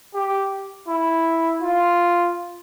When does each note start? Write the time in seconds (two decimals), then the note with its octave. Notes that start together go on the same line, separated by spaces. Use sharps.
0.14 G4
0.88 E4
1.62 F4